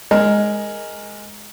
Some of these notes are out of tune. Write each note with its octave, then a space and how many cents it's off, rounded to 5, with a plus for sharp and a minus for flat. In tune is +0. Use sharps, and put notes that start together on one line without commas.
G#3 +0 A#4 +0